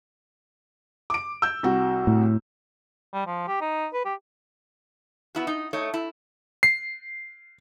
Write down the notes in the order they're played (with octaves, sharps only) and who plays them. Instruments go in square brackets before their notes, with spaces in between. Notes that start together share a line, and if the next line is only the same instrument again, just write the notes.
[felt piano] D6 D7
E6 G6
C2 F#4
[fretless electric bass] A2
[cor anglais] G3
F3
G4
D#4
B4
G4
[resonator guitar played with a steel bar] B3 E4 F#4
D#4
A3 D#4 C#5
E4
[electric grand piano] C7